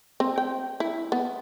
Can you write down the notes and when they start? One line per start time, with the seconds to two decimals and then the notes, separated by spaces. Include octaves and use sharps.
0.20 C4
0.38 G5
0.80 E4
1.12 B3